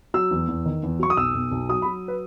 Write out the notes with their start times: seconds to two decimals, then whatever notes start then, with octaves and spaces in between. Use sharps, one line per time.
0.14 F#3 E6
0.31 E2
0.48 E2
0.65 D#3
0.83 E2
0.99 F#3 C#6
1.10 D#6
1.17 B1 E6
1.34 B1
1.52 B1
1.69 F#3 D#6
1.82 B5
1.86 F#3
2.08 B4